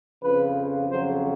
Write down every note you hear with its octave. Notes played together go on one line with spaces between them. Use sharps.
F2 C#3 F3 B4
F2 C#3 F#3 C5